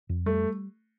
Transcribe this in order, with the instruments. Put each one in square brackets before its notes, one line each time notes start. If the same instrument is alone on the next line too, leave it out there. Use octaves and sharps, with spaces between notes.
[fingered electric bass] F2
[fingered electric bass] G3 [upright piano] A3